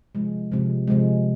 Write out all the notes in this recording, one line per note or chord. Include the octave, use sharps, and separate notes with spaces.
C3 F3 G#3
C3 F3 G#3
C3 F3 G#3